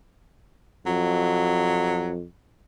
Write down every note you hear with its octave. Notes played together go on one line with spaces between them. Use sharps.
F2 F#3